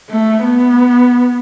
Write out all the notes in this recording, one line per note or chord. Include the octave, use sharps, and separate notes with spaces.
A3
B3